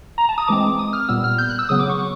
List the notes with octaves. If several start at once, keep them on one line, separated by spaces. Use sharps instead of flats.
A#5
A5
D#6
E3 G#3 C4 D6
D#6
F6
A#2 G3 B3 E6
F6
G6
F#6
E6
C#3 F#3 B3 D#6
D6
C#6